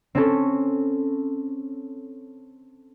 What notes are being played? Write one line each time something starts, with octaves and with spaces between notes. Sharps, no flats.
C4 C#4 A4